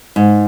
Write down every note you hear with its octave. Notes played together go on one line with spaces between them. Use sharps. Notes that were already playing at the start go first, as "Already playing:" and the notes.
G#2